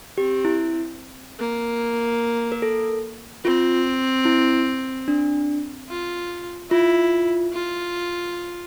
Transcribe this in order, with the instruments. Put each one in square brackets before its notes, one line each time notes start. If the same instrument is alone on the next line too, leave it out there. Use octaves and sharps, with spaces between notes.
[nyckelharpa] C4 [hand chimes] G4
[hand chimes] E4
[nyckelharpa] A#3
[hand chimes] A#4
A4
[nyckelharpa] C4 [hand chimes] F4
[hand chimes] E4
D4
[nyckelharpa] F4
[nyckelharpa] E4 [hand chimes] F4
[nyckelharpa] F4